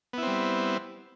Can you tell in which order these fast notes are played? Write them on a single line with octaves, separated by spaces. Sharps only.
B3 E4 C4 G3